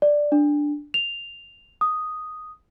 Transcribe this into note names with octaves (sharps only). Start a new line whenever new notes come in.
D5
D4
F7
D#6